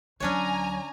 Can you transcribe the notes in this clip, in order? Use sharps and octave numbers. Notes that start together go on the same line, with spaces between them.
D2 F#3 C#4 D4 C#5 G#5 A#5